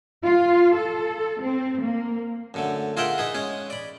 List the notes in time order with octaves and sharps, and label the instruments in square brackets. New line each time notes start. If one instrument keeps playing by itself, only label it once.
[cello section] F4
A4
C4
A#3
[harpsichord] F#2 D3 A3
F4 G#4 A#4 E5 F#5 G5
D#4 G#4 B4
G#3 C#4 G#4
D5 B5